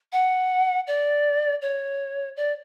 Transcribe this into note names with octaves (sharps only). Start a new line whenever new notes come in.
F#5
D5
C#5
D5